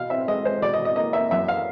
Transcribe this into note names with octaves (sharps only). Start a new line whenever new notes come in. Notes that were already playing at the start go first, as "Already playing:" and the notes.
Already playing: B2 F5
C4 E5
G#3 D#5
G#3 C5
B2 D5
D#5
B2
D#5
A#3 D#5
A#3 E5
F#2 E5
F5